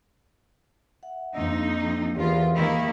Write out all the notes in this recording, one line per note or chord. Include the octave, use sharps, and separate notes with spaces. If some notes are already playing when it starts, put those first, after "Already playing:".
E5 F#5
F2 A#3 D4 D#4 E6
E2 F4 G4 A#4 C5
D#3 A#3 E4